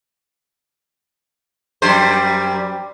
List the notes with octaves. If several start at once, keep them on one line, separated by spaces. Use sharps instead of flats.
F#2 G3 C5